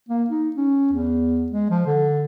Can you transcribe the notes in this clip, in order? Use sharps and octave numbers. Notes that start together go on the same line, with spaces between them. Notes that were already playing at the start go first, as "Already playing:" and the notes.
A#3
D#4
C#4
E2
G#3
F3
D3